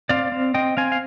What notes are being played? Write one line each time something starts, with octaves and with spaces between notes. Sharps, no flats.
C4 D5 F5
C4
C4 D#5 G5
C4 F5 G#5
F5